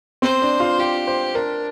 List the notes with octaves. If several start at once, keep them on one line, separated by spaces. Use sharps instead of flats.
C4 C5
D4
F4
F4 G4
C5
D4 A#4